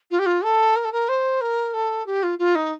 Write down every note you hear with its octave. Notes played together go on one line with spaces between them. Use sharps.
F4
G4
F4
A4
A#4
A4
A#4
C5
A#4
A4
G4
F4
F4
D#4